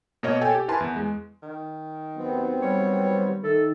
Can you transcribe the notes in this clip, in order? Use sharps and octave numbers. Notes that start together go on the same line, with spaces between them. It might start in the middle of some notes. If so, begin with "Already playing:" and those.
B2 A#3 C#5 D#5
A4 C#5 G5 G#5
G4
E4 A#4 B4 G#5 A5 C6
E2
G#3
D#3
D#2 F#3 B3 C4
G3 C#5
D#3 A3 A4